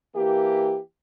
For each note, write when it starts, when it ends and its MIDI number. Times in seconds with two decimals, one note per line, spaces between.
0.15 0.77 52
0.15 0.77 58
0.15 0.77 67